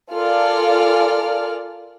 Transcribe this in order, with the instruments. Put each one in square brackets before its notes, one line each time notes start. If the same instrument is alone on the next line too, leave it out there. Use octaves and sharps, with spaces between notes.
[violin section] F4 A4 A#4 D5 G#5 F6